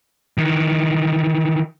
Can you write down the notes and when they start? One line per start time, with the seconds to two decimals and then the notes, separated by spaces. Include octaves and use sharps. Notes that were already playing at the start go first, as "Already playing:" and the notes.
0.38 D#3 E3